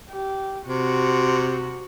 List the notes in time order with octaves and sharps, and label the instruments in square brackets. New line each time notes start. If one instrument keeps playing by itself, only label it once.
[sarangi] G4
[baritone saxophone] C3 [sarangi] F#4